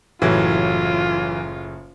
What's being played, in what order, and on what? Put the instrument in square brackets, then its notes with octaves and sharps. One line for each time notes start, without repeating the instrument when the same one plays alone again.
[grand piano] F#1 A2 [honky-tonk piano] E3 F#3 [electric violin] F4